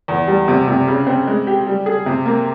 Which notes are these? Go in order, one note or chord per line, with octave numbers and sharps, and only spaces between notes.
E2
G3
C3
C3
C#3
C4
G#3
G4
G3
G#4
C3
A#3